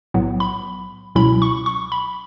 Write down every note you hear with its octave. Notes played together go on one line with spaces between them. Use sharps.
B1 A2 F#3 B3
B5
C#2 B2 F#3 C#4 E4 B5
C#6
C#6
B5